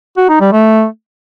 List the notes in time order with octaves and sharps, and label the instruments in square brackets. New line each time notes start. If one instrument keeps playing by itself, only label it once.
[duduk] F#4
D#4
G3
A3